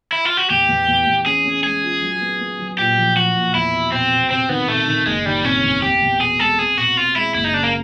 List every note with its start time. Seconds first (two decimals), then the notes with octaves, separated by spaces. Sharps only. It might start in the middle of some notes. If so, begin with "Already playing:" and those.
0.13 E4
0.25 F4
0.37 F#4
0.50 E2 G4
0.69 E2
0.88 E2
1.07 E2
1.26 C#4 G#4
1.45 C#4
1.64 G#3 G#4
1.83 F4
2.02 F#3
2.21 B3
2.41 B3
2.59 F#3
2.79 A#2 G4
2.98 F3
3.16 F3 F#4
3.35 A#2
3.54 E2 E4
3.74 B2
3.92 B2 C4
4.12 B2
4.30 C3 C4
4.49 D#3 B3
4.68 C3 A3
4.87 D#3
5.06 F#1 G#3
5.26 D#3 G3
5.44 C3 C#4
5.64 E2
5.82 E2 G4
6.02 E2
6.20 B2 G#4
6.39 G#3 A4
6.59 C4 G#4
6.78 B2 F#4
6.97 C4 F4
7.16 G#3 E4
7.35 F#1 E4
7.44 D#4
7.54 C#3 D4
7.63 A#3